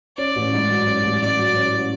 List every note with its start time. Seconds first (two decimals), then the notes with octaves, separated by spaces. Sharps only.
0.18 C#4 D5
0.36 A1
0.53 G#2
0.70 F#3
0.87 C#4
1.04 A1
1.21 G#2 D5
1.38 F#3
1.56 C#4